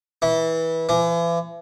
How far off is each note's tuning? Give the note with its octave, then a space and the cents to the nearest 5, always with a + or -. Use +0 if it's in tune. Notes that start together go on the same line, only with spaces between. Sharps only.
E3 -20
E3 +40